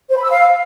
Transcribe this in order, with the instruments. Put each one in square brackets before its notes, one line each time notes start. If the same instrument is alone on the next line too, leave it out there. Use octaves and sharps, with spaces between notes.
[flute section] C5
B5
E6
F5